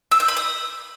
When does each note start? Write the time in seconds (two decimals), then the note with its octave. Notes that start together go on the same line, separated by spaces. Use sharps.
0.12 E6
0.20 G6
0.28 B5
0.37 D#6